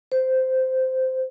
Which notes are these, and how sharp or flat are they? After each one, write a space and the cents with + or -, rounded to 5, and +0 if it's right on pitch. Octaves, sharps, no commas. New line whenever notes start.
C5 -10